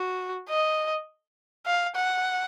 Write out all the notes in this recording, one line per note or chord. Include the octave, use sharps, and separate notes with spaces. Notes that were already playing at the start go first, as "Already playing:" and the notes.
Already playing: F#4
D#5
F5
F#5